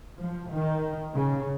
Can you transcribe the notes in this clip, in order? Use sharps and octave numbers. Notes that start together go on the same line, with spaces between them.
F3
D#3
C#3